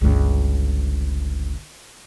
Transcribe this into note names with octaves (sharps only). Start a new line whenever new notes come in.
G1 C#2